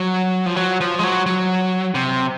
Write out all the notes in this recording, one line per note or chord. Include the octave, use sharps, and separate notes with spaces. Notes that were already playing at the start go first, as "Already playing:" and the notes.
Already playing: F#3
F3
F#3
F3
G#3
F#3
F#3
C3